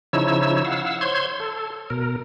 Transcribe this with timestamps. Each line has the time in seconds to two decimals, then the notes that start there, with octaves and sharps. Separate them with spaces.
0.13 C#3 F3 D#4 E4 C#5 E6
0.65 F5 F#5 E6
1.01 C5 C#5 C6 G#6
1.40 A4
1.90 B2 A#4